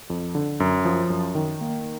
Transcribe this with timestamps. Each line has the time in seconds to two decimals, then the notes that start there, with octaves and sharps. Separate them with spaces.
0.10 F2
0.35 D3
0.60 F#2
0.85 F3
1.10 F#2
1.35 D#3
1.61 A#3